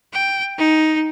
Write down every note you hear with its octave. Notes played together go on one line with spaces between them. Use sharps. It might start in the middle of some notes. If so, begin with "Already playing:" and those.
G5
D#4